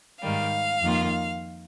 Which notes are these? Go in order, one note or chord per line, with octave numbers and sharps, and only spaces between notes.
G#2 D#3 G3 F5
F2 D#3 A#3 F4